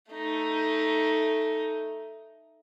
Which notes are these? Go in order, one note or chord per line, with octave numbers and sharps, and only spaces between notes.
A3 D#4